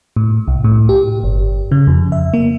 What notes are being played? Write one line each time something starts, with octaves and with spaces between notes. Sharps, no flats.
A2
C2
A2
G4
G1
C#3
F2
E5
A#3